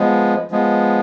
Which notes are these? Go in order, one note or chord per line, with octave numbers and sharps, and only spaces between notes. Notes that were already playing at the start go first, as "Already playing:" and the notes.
Already playing: F3 G#3 B3
F3 G#3 B3